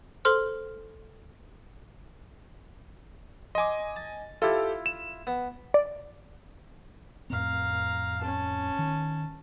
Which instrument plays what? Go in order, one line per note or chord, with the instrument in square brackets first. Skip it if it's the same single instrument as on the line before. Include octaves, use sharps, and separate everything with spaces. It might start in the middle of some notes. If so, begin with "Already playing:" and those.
[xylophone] A4 C5 C6 F6
[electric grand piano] D#5 G#5 [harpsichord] C6 D6
[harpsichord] A5
[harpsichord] E4 F4 [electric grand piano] G4 A4
[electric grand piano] E7
[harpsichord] B3
[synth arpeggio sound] D5
[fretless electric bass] F2 A2 C4 [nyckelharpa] F5 A#5
[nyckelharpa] C#4 A5
[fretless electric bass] D#3